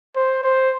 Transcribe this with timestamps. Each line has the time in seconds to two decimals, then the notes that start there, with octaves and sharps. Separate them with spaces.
0.16 C5
0.44 C5